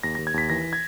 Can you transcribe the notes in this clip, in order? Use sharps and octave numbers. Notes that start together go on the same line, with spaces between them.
D#2 A#6
A#6
D#2
G#6
D#2 B6
E3 A#6
G#6